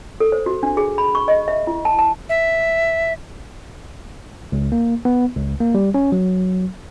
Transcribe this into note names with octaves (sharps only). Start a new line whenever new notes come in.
A4
C5
F#4
D4
G#4
B5
C#6
D#5
E5
E4
A5
A5
E5
C#2
A#3
B3
C#2
A#3
G3
C#4
F#3